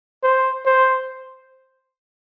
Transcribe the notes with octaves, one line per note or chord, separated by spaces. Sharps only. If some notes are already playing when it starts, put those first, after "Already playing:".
C5
C5